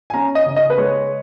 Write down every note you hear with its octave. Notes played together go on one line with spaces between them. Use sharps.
G#5
C#4 A#5
D#5
C#3
D#5
B4
G#3 C#5